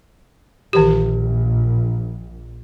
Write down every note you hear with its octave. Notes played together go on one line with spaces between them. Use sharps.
A#1 D#3 E3 G4